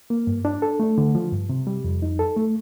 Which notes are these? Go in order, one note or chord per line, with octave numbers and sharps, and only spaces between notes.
A#3
G2
D4
A4
A3
D3
F3
G2
C3
G3
F2
D#4
A4
A3